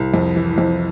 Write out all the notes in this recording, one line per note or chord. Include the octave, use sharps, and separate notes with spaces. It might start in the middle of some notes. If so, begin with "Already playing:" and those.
Already playing: C2
F2
E3
F2